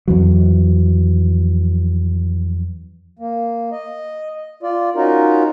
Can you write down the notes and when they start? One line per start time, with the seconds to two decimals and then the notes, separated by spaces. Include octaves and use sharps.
0.08 F2 E3 F#3
3.19 A#3
3.72 D#5
4.63 F4 D5
4.95 C#4 D#4 F4 F#4 A#4